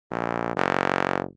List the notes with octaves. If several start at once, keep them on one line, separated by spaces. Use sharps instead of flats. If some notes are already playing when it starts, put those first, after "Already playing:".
A#1
F#1